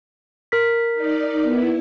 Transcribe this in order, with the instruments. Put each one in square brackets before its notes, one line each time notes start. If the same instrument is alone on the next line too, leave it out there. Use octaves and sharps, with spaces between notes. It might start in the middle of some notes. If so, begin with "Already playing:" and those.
[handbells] A#4 B6
[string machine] D#4 D5
B3 E4